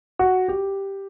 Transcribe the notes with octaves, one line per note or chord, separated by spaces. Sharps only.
F#4
G4